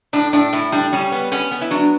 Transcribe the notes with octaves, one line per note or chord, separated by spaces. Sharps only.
A2 D4
A2 D4
A2 E4
G3 D4
G3 C#4
B3
B3 C#4
B3
E4
F#3 D4